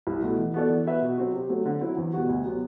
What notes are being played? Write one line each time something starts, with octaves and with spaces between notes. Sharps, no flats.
C2
B2 A3 E4
E3
B3 F#4 A4 D5
E3
B3 F#4 B4 E5
B2
F#3 C4 F#4
C3
F#3 A3 C4
D3
F#3 C4 E4
E2
B2 G3 B3 F#4
D2
C3 F#3 B3